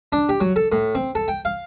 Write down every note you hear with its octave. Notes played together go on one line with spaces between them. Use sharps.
D4
G4
F#3
A4
A2
C4
A4
G5
F5